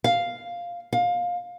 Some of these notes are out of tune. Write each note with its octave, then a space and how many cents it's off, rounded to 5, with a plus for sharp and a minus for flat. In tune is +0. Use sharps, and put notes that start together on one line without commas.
F5 +0
F5 +20